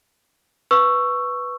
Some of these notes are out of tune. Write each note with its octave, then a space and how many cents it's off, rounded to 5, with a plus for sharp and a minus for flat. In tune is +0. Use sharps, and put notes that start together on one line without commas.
B4 +0 C#6 +0 E6 +15